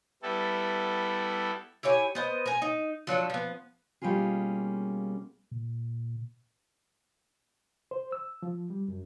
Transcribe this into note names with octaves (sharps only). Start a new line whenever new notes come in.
G3 B3 E4 A4
E4 G4 C#5 G#5
B3 C5 D#5
A#4 G#5
D#4
F3 F#3 D4 A4
F3 B3
B2 G3 A#3 C#4 F4 G#4
A#2
C5
E6
F3
G3
F#2